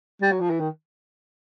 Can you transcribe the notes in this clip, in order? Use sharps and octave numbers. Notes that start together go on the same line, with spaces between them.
G3
F#3
F3
E3
D#3